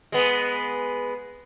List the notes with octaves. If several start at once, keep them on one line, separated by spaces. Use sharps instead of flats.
G#3 B3